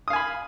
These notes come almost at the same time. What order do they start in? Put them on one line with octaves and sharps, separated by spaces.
D#6 F5 G#5 B5